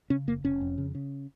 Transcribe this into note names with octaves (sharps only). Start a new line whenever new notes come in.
C#3 C#4
F1 A#3
F1 C#4
F2
C#3
C#3